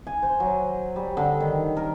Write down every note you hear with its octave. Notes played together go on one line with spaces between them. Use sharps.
G#5
C5
F#3
G3
D3
D#3
A#4